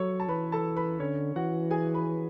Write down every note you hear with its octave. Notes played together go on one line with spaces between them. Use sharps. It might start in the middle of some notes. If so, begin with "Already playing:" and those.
Already playing: F#3 A4 C#5 C#6
A5
E3 B4 B5
A4 A5
B4 B5
D3 C#4 C#5
E3 F#4 F#5
G#4 G#5
B4 B5